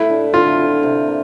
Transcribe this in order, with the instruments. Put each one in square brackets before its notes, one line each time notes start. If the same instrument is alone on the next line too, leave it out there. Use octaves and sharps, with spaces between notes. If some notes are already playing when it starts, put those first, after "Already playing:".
Already playing: [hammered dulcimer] A2 [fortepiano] E4
[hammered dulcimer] D4
[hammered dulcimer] D3 [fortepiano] F4
[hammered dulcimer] C4
C3
A#3